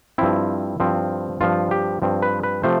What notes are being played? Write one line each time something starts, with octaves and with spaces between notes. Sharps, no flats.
G2 F3 C4 E4
G2 F3 C4
G2 F3 C4 F4
G4
G2 F3 C4
B4
B4
C3 F3 A3 C5